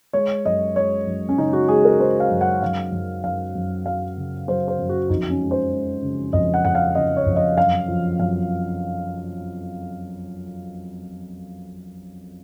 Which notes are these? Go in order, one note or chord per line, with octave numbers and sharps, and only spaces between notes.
G#3 C#5
F#2 D#5
G#3 C#5
F#2
C#4
C#3 D#4
F#4
G#3 G#4
A#4
G#3 C5
F5
F#2
F#5
F#2 F5
F#2
F#2 F5
F#2
F#3 F5
C#3
F#3 C5
C5
F#2
F#4
F2 D#4
C#4
G#3
C5
G#3
C#3
F2 D#5
F#5
F2 F#5
F5
C#3 D#5
C#5
F2
D#5
F#2 F5
F3
F#2 F5